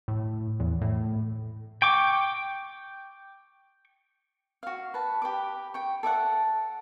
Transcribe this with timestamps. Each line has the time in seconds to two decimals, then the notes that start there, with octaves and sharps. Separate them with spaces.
0.08 A2
0.60 E2
0.81 A2
1.82 G5 C#6 D6
4.63 F#4 F5
4.94 B4 A5
5.22 G4 B4 D6
5.74 G5 C#6
6.03 A4 D5 E5 F#5